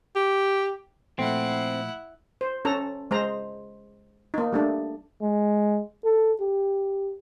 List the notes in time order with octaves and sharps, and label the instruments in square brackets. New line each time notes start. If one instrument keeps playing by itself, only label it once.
[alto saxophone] G4
[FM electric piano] A#2 F3 A3 [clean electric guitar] C4 [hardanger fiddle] E4 F#5
[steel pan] C5
C#4 A4 A#5
G#3 C5 A#5
A#3 D#4
G3 A3 D4
[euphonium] G#3
A4
G4